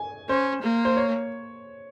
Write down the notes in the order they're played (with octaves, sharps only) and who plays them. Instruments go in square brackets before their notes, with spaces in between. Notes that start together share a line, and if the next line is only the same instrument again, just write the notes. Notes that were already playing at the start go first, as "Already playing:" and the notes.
Already playing: [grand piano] G#5
[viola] C#4 [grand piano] C5
[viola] A#3
[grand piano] C5
C#5